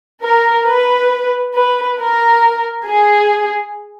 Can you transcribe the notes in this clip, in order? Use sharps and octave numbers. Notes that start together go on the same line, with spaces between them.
A#4
B4
B4
A#4
G#4